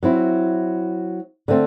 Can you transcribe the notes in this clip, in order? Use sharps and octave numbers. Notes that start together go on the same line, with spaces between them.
F#3 C4 E4
D3 A3 C4